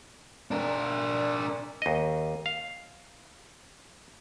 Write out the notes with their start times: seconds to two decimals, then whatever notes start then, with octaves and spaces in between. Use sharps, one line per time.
0.51 D4 A#4
1.82 D#2 D#5
2.46 F5